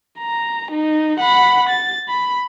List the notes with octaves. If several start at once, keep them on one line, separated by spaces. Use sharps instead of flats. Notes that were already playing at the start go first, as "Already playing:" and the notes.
A#5
D#4
F#5 B5
A6
B5